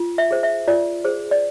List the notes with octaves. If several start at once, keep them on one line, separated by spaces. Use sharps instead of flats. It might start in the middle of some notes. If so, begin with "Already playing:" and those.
Already playing: F4
E5
G#4 C5
E5
F4 D5
G#4 C5
D5